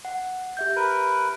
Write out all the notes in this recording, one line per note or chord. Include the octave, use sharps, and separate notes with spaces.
F#5
G4 E5 G6
A#4 B4